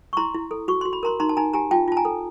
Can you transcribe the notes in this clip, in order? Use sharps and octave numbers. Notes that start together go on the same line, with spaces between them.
C#6
E4 A#5 C6
E4
A4
F#4 C#6
F#4 C6
B5
A#4 A#5 C6
D#4 A#5 C6
A5
D#4 G#5 A#5
G4 G#5 A#5
F4 G5 A5
F4 A5
G#5 A#5
A4